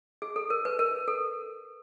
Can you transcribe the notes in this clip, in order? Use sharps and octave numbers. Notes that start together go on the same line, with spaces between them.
G#4
A4
A#4
B4
A#4
A4